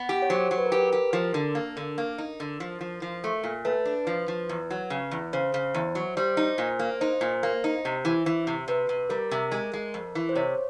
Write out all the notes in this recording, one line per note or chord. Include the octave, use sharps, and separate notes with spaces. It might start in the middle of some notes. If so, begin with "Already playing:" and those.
Already playing: B3 F#5
G4
C#5
F#3 C5
F#3
B4
A#4
G4 B4
A#4
G4
F3 A#4
D3
A#3
D3
A#3
D#4
D3
F3
F3
F3
A3
A#2
A3 B4
D4
F3
F3
E2
F#3
C#3
E2
C#3 C5
C#3
E2
F#3
G3 C5
D#4
A#2
A#3
D#4 C5
A#2
A#3
D#4
C3
E3
E3
C3
C3 B4
C3
G3 A#4
C3
G#3
G#3
F2
E3
C5
C3 C#5